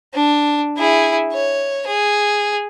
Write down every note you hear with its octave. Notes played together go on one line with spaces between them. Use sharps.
D4
E4 G#4
C#5
G#4